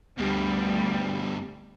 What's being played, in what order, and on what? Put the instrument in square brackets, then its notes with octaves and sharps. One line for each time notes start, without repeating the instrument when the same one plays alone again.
[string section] D2 G3 [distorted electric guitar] G2 B2